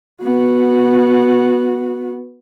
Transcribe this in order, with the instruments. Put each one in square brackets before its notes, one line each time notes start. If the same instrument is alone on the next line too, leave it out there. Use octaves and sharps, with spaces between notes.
[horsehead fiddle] B3 F#4